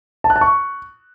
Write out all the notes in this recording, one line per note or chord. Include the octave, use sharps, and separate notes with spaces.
A5
F#6
A5
C#6